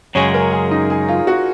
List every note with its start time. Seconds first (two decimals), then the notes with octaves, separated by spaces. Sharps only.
0.15 F#2 C#3 G#3 C#5
0.34 A#4
0.52 G#4
0.71 D#4
0.90 G#4
1.08 F4
1.27 F#4